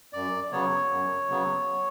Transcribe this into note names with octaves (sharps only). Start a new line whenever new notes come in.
F#2 D5
C#3 F#3 B3 C#5
F#2
C#3 F#3 B3